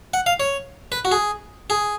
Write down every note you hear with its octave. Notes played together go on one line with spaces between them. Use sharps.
F#5
F5
C#5
B4
F#4
G#4
G#4